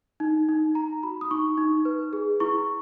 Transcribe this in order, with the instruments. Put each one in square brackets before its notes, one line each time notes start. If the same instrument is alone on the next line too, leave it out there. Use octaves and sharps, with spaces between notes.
[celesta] D#4
D#4
D#4 A#5
F#4 B5
D#6
D#4 C#6
D#4
B4
G#4
E4 C#6